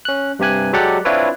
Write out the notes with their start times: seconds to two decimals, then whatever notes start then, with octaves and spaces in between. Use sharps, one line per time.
0.05 C#4 F#6
0.39 G2 C3 G4 G#5 F#6
0.73 F#3 G#3 G4 A4 D5 F#5
1.05 C4 D4 E4 F4 B4 C#5